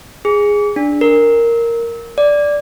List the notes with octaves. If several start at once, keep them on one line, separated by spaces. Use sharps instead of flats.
G#4
D4
A#4
D5